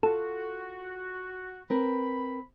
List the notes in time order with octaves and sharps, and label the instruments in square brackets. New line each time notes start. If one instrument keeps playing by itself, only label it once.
[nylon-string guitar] F4 [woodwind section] F#4 [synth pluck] A4
[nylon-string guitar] C4 A#4 B4 [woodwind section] B5